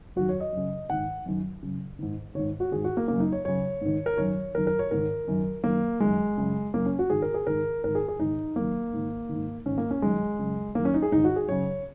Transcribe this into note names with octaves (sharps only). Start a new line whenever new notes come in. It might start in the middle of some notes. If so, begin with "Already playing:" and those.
F#2 D#3 F#4
C#5
D#5
F#2 C#3
G#2 D#3 F#5
F#2 D#3
F#2 C#3
G#2 D#3
G#2 D#3 C#5
F#4
G#2 D#3 G#4
F#4
A#3
F#2 C#3 A#3
D#4
C#5
F#2 C#3 C#5
G#2 D#3
A#4
F#2 D#3 C#5
F#2 D#3 A#4
A#4
C#5
G#2 D#3 A#4
F#2 D#3
F#2 D#3 A#3
F#2 D#3 G#3
F#2 C#3
F#2 C#3 A#3
C#4
F#4
G#2 D#3 G#4
A#4
G#4
G#2 D#3 A#4
G#2 D#3 A#4
G#4
G#4
G#2 D#3 D#4
F#2 D#3 A#3
G#2 D#3
D#3
G#2
G#2 D#3 C#4
A#3
C#4
F#2 D#3 G#3
F#2 C#3
F#2 D#3 A#3
C#4
D#4
G#4
G#2 D#3 D#4
F#4
G#4
F#2 C#3 C#5